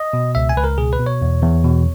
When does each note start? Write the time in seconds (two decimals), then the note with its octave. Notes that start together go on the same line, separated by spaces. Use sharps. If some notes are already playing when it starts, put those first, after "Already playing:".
Already playing: D#5
0.13 B2
0.35 C#2 E5
0.49 G#5
0.57 C#2 B4
0.64 A#4
0.78 B2 G#4
0.93 B4
0.99 B2
1.06 C#5
1.22 E2
1.43 E2
1.64 B2